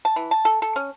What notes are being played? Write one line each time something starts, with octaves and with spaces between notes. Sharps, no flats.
A5
E3
A5
A4
A4
C#4